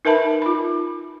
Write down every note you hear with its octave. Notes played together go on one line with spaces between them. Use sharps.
D#4 A#4 B4 E5 A5 B5
F4 B5